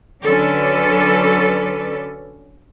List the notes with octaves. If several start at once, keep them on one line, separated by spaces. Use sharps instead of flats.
D3 F#3 C#4 A4 B4 D5